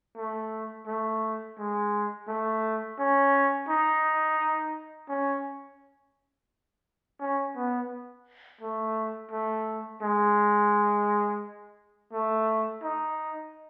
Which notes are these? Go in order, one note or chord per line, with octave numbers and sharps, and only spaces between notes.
A3
A3
G#3
A3
C#4
D#4
C#4
C#4
B3
A3
A3
G#3
A3
D#4